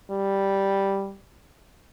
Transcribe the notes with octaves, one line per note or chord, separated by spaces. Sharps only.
G3